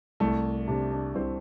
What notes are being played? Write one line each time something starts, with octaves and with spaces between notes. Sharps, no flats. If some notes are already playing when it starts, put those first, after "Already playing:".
C2 A3
C3 D4
D4
C2 C4